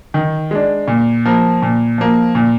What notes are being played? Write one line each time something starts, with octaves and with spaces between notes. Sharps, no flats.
D#3
G#3 D4
A#2
F3 A#3
A#2
F3 A#3
A#2